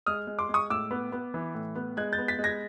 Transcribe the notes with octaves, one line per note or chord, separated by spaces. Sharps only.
G#3 D#6 F6
G#3
C6 D6
G#3 C#6 D#6
A2 D6 E6
B3
B3
E3
A2
B3
G#3 F#6 G#6
G6 A6
B3
A6 B6
G#3
G#6 A#6